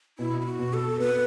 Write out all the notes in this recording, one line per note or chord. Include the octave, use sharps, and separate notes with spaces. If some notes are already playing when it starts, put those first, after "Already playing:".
B2 E4
E4
F#4
B2
A4
B3 B4